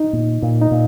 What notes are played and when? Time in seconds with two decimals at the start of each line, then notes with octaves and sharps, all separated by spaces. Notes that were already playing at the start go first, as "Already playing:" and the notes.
Already playing: D#4
0.13 A#2
0.42 A#2
0.62 D#4
0.71 A#2